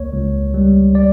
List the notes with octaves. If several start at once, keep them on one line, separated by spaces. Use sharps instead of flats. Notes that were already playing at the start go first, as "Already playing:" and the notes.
Already playing: C#2 A#3 C#5
C#2
G3
D5